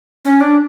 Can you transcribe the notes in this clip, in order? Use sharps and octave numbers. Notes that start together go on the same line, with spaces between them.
C#4
D4